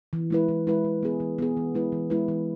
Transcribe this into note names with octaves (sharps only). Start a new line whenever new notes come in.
E3
G#3 E4 B4
E3
G#3 E4 B4
E3
B3 G#4
E3
B3 G#4
E3
G#3 E4 B4
E3
G#3 E4 B4
E3